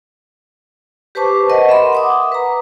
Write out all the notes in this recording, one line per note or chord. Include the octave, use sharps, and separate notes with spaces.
G4 B4 C5 A5 C#6 D6
A#4 B4 D#5 F#5
E5 B5 C6
F#5 D6 D#6
B4 A#5